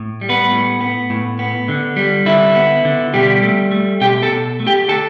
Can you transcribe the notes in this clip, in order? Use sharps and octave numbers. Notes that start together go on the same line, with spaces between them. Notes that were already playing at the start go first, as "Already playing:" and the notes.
Already playing: A2
G3
B3 B4
A2
B3
A2
B3
D3
G3
D3 E4
B3
D3
B2 G3 G4
A3
A3
B2 G4 G5
A4 A5
B2
A3
G4 G5
D3 A4 A5